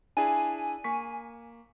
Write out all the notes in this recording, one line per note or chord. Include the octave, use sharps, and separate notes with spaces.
D4 E4 G#4 G#5
A#3 C#6 B6